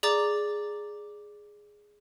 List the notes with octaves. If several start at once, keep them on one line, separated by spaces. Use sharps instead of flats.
G#4 D5 A#5 D6 A6